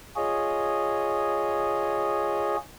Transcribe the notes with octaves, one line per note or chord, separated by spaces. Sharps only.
F4 G#4 C#5 D#5